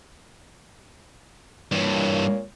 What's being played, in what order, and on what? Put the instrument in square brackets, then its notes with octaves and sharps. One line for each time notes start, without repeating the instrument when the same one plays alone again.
[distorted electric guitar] G2 E3 [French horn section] A#2 A#3 C#5